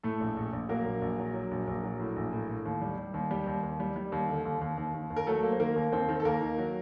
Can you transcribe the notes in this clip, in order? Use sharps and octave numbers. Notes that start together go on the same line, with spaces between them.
A2 A3 A4
A#1
A#1
A#1
F#3 A#3 A#4
A#1
A#1
F#3
F#3
A#1
A#1
F#3
A2
A#1
A2
A2
D#2
G3
G3
D#2
G3 G4
D#2
D#2
G3
G3
D#2
D3
D#2
D#2
D#2
D#2
D#2
A#4
F#3 A3 A4
A#3
C5
D#3 A#3 A#4
D#2
D#2 C4 C5
D#3
A4
D#2 A#3 A#4
D#3
F#3